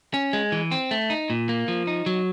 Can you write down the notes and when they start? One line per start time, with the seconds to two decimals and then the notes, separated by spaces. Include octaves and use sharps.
0.14 C#4
0.33 G#3
0.52 E3
0.71 C4
0.91 A3
1.10 D#4
1.30 A#2
1.49 A#3
1.68 F3
1.87 D#4
2.06 F#3